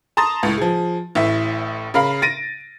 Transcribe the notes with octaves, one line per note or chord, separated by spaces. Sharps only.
A5 A#5 C6 D#6 A6
C#2 A2
F3 G#4
A1 A2 E5
C#3 A#4 F5 B5
A6 A#6 D7 D#7